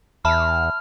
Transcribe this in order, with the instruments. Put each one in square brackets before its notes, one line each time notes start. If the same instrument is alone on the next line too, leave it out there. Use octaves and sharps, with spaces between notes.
[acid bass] E2 [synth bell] E5 A5 B5 [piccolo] F6